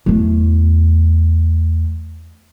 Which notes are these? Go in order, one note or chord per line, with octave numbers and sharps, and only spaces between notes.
E2 A3